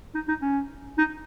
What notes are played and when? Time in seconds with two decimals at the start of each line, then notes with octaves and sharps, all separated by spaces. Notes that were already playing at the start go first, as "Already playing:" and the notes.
0.15 D#4
0.28 D#4
0.42 C#4
0.98 D#4